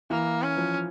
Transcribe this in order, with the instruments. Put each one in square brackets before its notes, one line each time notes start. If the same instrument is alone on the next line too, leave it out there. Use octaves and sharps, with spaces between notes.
[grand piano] E3 [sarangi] A#3
[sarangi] C#4
[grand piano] F3